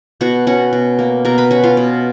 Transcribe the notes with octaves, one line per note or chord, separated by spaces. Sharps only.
B2 F#4 F#5
C#4 F#4 F#5
B2
A#3
B2 A#4 A#5
B4 B5
C#4 F#4 F#5
F4 F5
B2